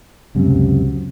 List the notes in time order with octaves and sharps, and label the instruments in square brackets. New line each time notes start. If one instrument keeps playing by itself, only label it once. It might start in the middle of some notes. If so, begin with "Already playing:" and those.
[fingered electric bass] C#2 F#2 C3